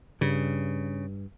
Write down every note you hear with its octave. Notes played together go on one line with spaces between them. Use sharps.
G2 C#3